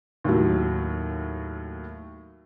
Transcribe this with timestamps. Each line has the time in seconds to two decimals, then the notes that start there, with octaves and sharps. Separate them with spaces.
0.24 D#2 A2 F#3